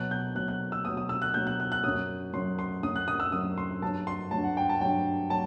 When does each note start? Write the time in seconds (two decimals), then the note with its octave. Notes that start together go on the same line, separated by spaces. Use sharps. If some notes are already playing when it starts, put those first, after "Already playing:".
Already playing: B2 F#3 F#6
0.11 G6
0.35 B2 F#3 F#6
0.48 F#6
0.72 E6
0.85 B2 F#3 D#6
0.97 D#6
1.09 E6
1.22 F#6
1.34 B2 F#3 G6
1.47 F#6
1.60 F#6
1.72 F#6
1.84 F#2 F#3 D#6
2.33 F#2 F#3 C6
2.59 C6
2.83 F#2 F#3 D#6
2.96 F#6
3.08 D#6
3.20 E6
3.32 F#2 F#3 D#6
3.58 C6
3.82 G2 F#3 A5
4.07 C6
4.31 G2 F#3 A5
4.44 F#5
4.57 G5
4.69 A5
4.81 G2 F#3 G5
5.30 F#3 A5